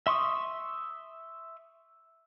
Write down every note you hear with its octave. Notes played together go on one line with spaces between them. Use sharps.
E5 C6 C#6 D#6